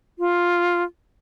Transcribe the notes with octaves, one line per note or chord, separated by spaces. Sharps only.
F4